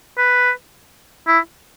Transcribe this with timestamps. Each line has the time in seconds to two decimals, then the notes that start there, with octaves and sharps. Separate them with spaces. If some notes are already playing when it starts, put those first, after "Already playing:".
0.18 B4
1.28 E4